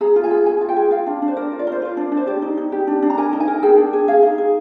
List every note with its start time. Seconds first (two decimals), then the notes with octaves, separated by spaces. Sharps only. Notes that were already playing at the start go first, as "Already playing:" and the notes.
0.01 G#4 A#5
0.16 F4
0.24 G#5
0.31 G#4
0.46 G#4 G#5
0.61 F4
0.69 G5
0.76 G#4
0.91 F4 F5
1.07 D4
1.22 D4
1.28 C5
1.37 A#4 D5
1.52 F4
1.59 D5
1.67 A#4 C5
1.82 F4 D5
1.97 D4
2.12 D4
2.17 C5
2.27 G4 D5
2.42 D#4
2.57 D#4
2.72 G4
2.87 D4
3.03 D4
3.10 A#5
3.17 A#4 G#5
3.33 D#4
3.40 G#5
3.48 A#4
3.63 G#4 G5
3.78 D4
3.93 G#4
4.08 G#4 F5
4.23 D#4
4.38 G#4